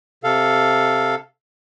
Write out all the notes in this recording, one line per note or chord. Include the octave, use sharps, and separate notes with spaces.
C3 A4 F5